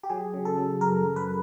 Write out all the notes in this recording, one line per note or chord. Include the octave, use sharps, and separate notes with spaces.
G4
F#3 G#4
C#3
A4
F#3
F#2 A#4
F#2
B4